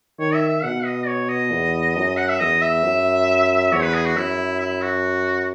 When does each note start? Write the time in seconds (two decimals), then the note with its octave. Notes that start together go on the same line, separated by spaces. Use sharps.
0.19 D#3 C#5
0.34 E5
0.49 E5
0.63 B2 F#5
0.85 D#5
1.08 C#5
1.29 D#5
1.52 E2
1.96 F#2
2.17 F#5
2.29 E5
2.40 E2 D#5
2.62 E5
2.83 F#2
3.72 E2 C#5
3.83 B4
3.94 G#4
4.06 F#4
4.16 F#2 E4
4.60 E4
4.82 F#4